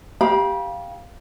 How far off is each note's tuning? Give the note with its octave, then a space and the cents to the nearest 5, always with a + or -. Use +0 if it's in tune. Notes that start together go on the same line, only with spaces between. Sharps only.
G4 +0 F5 +0 B5 -40